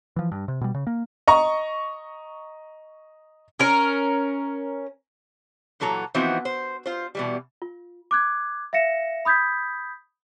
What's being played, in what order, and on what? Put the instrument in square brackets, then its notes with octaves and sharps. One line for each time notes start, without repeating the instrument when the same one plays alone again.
[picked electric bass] E3 F3
G2
C3
B2 G3
C#3
A#3
[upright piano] D#5 A#5 C#6
[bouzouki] C#4 A#4
[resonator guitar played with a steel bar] A#2 E3 F#3 A4 A#5
E3 F3 B3 C4 D#4 F#4
C5
F4 C5
B2 E3 G3
[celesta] F4
D6 F#6 G#6
E5 F5 A#6 C#7 E7
B5 D#6 G6 G#6 B6